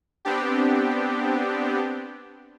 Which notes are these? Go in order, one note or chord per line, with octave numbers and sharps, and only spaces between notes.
B3 C4 D4 G4